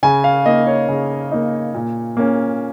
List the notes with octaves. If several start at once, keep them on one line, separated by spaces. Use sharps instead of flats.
C#3 G#5
F5
A#3 D#4 D#5
C#5
C#3
A#3 D#4
A#2
A#3 C#4